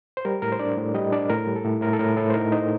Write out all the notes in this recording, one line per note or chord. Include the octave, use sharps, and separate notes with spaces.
C5
G3 A#4
A2 A#4
C5
D4 D5
A2
G3 D#5
D4 D5
A2 A#4
G3
A4
A2
A2 A#4
A4
A2 A#4
A2 A4
C5
D#4 A#4
D#4 C5